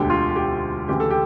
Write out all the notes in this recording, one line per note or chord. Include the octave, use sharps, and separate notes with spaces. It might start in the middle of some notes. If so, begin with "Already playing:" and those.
Already playing: E1 D2 D3 G4
F4
G4
D2 C#3 E3 G4
A4
G4